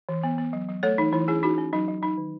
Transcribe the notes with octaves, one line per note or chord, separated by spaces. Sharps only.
E3
B3
B3
F#3
F#3
A3 A4 C#5
E3 D#4
E3 E4
C#4 E4 G#4
C#4 D#4 F#4
C#4
F#3 D#4
F#3
F#3 D#4
D#3